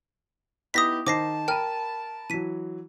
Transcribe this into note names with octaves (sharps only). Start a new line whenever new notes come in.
B3 D#4 E4 G4 D#6 A#6 B6
D#3 D#4 C5 A5 D6 A#6 C7
A#4 G5 B5 F6 D#7
E3 F#3 B6 D#7